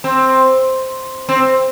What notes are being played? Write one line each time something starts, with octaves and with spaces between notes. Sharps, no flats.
C4
C4